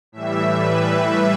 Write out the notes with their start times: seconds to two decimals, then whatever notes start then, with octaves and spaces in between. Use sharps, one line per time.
0.12 A2 E3 G3 E5
0.57 B4